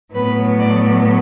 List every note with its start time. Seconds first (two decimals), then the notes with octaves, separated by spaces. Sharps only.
0.14 A2 F#3 B3 B4
0.59 D5